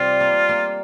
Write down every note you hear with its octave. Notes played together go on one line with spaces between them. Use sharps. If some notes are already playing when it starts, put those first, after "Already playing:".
Already playing: C3 G3 F4
A#3
A#3